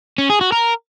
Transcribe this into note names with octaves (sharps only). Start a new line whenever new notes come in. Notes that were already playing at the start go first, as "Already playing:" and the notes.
C#4
G#4
F#4
A#4